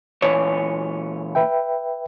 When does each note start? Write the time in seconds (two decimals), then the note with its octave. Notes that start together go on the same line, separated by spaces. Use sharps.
0.22 A#2 E3 C#5
1.35 B4 E5 G5